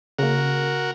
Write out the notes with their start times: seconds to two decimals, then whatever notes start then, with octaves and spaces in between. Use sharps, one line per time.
0.19 C#3 A#3 F#4 A#4